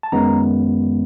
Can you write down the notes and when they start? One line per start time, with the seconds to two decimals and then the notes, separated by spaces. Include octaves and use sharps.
0.03 A5
0.12 F#2 D#3 G#3 B3 A#5